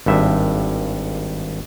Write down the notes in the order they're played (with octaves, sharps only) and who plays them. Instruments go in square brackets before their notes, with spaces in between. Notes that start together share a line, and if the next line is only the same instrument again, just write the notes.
[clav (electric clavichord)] G#1 G2 E5